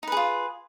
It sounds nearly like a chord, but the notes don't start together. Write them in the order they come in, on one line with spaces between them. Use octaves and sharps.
D#4 B4 G#4 F4